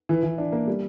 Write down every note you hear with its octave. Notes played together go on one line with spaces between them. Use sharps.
E3
E3
D4
A#3
G3